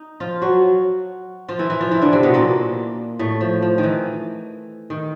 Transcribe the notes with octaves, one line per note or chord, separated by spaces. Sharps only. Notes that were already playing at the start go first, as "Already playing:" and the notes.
Already playing: D#4
F3 F4
F#3 F#4
F3 F4
E3 E4
E3 E4
F3 F4
E3 E4
D3 D4
C3 C4
B2 B3
A#2 A#3
A2 A3
F3
F3
D#3
E3
D#3